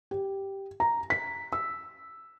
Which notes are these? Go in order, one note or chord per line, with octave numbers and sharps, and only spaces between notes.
G4
A#5
B6
E6